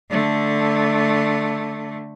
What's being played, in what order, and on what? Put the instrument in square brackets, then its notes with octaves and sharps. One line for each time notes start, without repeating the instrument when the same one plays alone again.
[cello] D3 A3